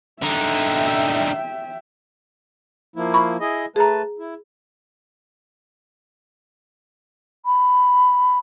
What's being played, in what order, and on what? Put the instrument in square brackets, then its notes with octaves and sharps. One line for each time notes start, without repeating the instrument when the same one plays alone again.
[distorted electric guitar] D3 D#4 [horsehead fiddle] E5 G5
[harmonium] F3 A#3 E4
[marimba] B5 C#6
[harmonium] E4 G#4 D#5
[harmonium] A3 B4 A5 [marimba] G#4 A#5
[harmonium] E4
[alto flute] B5